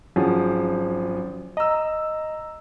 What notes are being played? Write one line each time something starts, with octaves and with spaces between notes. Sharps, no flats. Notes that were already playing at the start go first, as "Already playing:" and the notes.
G#1 F3 F#3 C#4 G#4
D#5 A#5 E6